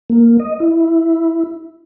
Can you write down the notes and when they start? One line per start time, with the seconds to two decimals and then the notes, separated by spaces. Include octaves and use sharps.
0.10 A#3
0.40 D#5
0.60 E4